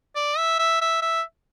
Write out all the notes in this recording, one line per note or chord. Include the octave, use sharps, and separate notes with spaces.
D5
E5
E5
E5
E5